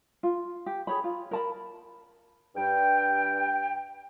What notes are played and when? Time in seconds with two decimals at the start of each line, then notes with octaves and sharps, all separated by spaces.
0.23 F4
0.66 G4
0.87 G#4 C#5 B5
1.04 F4
1.31 A#4 A5 B5
2.56 G2 G5